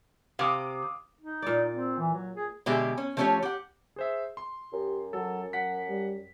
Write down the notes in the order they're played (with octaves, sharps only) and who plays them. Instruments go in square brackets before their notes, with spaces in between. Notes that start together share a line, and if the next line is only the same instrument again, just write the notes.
[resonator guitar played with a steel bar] C3 [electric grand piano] F5 D6 D#6
[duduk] D#4
[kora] A#2 D5
[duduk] C4
E3
F#3
G#4
[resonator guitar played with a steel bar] B2 D3 G#3 G4 G#4 E5
C#4
F3 A3 C#4 F4 G4 C#5
G4 F#5
[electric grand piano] G#4 C5 E5
C6
[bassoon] F#2 [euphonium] G4
[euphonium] F#3 [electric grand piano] A4
[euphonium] F#3 [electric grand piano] F#5 B6
[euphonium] G3